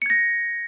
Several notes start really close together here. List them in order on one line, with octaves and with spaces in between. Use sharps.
C#7 G#6 A#6